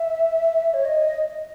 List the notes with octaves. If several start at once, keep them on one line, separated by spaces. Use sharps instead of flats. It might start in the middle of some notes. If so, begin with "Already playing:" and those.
Already playing: E5
C#5
D#5